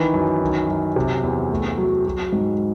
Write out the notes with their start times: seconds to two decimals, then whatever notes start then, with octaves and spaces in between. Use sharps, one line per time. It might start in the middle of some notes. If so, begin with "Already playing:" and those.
Already playing: D#3 E3
0.14 F#2
0.41 D#3
0.68 F#2
0.96 C3
1.23 E2
1.50 A3
1.77 F#3
2.05 F#3
2.32 G#2